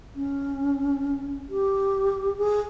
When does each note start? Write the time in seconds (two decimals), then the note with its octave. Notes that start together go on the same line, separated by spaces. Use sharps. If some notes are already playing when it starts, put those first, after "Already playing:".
0.16 C#4
1.50 G4
2.37 G#4